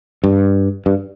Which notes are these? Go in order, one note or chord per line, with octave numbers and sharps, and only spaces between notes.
G2
G2